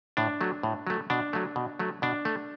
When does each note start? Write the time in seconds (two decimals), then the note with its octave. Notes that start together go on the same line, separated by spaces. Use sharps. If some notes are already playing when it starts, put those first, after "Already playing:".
0.17 A2 D4
0.41 F#3 A3
0.63 A2
0.87 F#3 A3
1.10 B2 D4
1.33 F#3 A3
1.56 B2
1.79 F#3 A3
2.02 B2 D4
2.25 A3